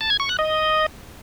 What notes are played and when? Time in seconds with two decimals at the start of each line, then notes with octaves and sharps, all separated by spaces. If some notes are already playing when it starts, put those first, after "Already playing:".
0.01 A5
0.10 G#6
0.20 C#6
0.29 F#6
0.39 D#5